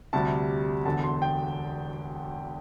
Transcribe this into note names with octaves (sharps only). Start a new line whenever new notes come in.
D2 C3 G3 A5
E1 E2 D3 A5
C6
G5